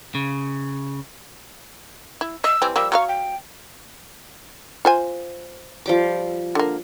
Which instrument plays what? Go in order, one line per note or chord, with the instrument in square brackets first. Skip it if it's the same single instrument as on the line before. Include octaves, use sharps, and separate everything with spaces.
[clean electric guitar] C#3
[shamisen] E4
[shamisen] D#5 [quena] E6
[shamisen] E3 G3 C4
[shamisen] F3 G3 A#3 [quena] E6
[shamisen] F#3 F4 F5 [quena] C#6
[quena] G5
[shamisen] F4 C5 G#5
[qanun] F3 G3 D6
[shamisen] D3 A#3